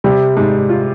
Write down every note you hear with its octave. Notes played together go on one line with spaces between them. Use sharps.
C3 G3
G#2
F4